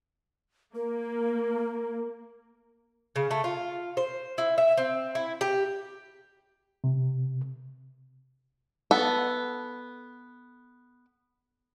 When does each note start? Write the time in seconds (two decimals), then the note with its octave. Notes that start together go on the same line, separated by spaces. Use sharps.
0.75 A#3 A#4
3.16 C#3
3.31 A3
3.44 F4
3.97 C5
4.38 E4
4.58 E5
4.78 C4
5.15 E4
5.41 G4
6.84 C3
8.91 B3 A4